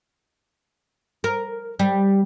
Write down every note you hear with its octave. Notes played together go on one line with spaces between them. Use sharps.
A#4
G3